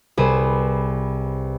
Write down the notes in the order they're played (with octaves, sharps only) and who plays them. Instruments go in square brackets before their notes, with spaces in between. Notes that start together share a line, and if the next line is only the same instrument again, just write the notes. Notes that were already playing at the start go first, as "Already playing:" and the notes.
[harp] C2 G#4 B4 C5